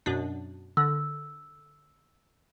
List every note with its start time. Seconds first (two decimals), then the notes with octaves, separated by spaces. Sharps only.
0.06 F#2 B2 D4
0.77 D3 E6